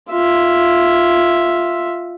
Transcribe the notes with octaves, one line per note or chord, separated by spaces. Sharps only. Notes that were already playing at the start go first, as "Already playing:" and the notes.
F4 E5